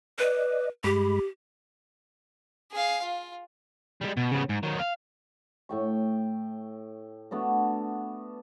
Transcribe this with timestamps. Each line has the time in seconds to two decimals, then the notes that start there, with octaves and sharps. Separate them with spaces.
0.19 B4 D5 D#5
0.84 G2 G#3 G4 B5
2.72 G#4 F5
3.03 F4
4.01 G3 G#3
4.17 B2
4.31 C#3 B3
4.49 G#2
4.63 D#3 F#3
4.79 F5
5.69 A2 G5 C#6
7.31 A3 B3 D4 F#4